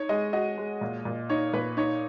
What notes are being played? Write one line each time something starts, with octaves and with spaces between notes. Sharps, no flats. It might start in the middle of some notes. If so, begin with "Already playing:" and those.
Already playing: D#4 C#5
G#3 D#5
F#4 D#5
G#3
A#2
A#2
D#4 C#5
A#2 B4
D#4 C#5